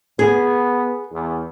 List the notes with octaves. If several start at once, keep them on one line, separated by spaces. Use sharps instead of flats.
B3 G#4
E2